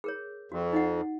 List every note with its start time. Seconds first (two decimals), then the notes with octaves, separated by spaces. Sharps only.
0.04 G#4 A#4 C#5
0.52 F2 F#4
0.73 D#4 D#5 F#5